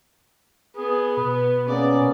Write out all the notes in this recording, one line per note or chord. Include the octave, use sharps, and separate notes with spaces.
B3 G#4
B2 B4
A#3 B3 C#4 G#4 D5